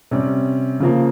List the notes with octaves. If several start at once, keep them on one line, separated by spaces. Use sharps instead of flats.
C3 G3 C#4
C#3 F3 A#3